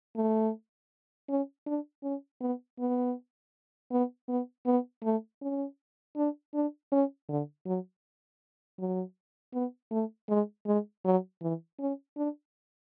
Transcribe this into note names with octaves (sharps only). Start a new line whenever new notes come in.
A3
C#4
D4
C#4
B3
B3
B3
B3
B3
A3
C#4
D4
D4
C#4
D3
F#3
F#3
B3
A3
G#3
G#3
F#3
E3
C#4
D4